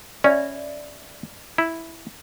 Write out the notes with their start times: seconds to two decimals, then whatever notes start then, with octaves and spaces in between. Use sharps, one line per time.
0.24 C#4 D5 E5 B5
1.58 E4